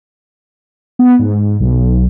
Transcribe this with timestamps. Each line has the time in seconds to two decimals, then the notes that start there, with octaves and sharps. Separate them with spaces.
0.99 B3
1.19 G#2
1.60 B1